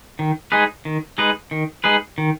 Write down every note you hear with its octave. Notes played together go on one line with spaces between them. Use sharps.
D#3
G#3 D#4 G#4 B4
D#3
G#3 D#4 G#4 B4
D#3
G#3 D#4 G#4 B4
D#3